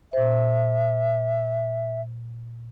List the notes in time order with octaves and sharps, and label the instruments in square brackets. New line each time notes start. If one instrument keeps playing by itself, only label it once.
[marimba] A#2 C5 [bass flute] E5